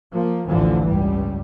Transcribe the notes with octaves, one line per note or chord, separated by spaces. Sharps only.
F3 A#3
A1 D2 D3 E3 F3
C#2 G2 G3